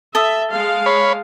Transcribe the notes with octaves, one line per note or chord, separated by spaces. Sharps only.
A4 E5 D#6
G#3 F5
C#5 B5